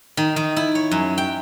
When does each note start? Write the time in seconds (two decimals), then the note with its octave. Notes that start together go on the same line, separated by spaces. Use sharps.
0.17 D#3
0.36 D#3
0.56 E4
0.75 C#5
0.91 F#2
1.18 G5